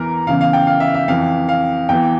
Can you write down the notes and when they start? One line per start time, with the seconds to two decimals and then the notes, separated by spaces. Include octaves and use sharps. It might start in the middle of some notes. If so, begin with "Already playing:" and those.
Already playing: E2 E3 A#4
0.27 E2 C#3 E3 F5
0.41 F5
0.53 G5
0.67 F5
0.80 E5
0.94 E5
1.08 F2 E3 F5
1.49 F5
1.89 E2 E3 G5